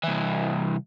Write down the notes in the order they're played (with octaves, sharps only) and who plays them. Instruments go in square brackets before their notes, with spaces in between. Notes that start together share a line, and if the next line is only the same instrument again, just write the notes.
[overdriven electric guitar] C2 E3